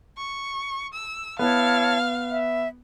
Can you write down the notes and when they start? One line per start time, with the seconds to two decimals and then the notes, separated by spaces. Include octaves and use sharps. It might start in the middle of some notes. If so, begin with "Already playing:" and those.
0.17 C#6
0.94 E6
1.39 B3 E4 C#5 F5 A5
2.30 E5